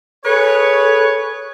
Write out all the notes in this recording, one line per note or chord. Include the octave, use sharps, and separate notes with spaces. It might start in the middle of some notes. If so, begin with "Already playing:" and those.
G#4 A4 B4 C#5